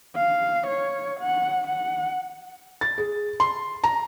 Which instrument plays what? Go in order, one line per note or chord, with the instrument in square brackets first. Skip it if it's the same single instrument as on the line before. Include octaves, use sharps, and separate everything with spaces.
[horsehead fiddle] F5
C#5
F#5
F#5
[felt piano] A6
G#4
C6
A#5